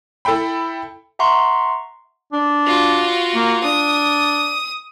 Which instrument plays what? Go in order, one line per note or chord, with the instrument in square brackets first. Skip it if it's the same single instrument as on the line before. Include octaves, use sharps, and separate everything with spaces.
[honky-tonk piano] E4 A4 E5 G5 B5
[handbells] E5 F#5 A#5 C6 C#6
[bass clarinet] D4
[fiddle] F4 F#4
[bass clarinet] A#3
[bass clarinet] D4 [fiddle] D#6